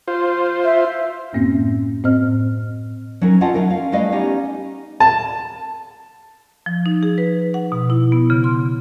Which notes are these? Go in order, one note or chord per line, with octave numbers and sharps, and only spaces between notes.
F4 C5
E5
F#2 A2 A#3 C4 C#4
A2 C4 C5 D#5 F6
F#3 C#4 D#4 A#4
C4 C#4 F4 D#5 F#5 A5
F#3 D#4 E4 A#4
C#4 F5
G3 A3 E4 B4 D#5 F5
B3 C#4 D#4 G4
A5
F3
D#4
G#4
B4
F#5
B2
E4
B3
C#3
C6